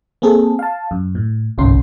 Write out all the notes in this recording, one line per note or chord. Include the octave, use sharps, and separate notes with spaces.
A#3 C4 G#4 A4
F5 A5
F#2
A2
G1 C2 G#2 C#4 C6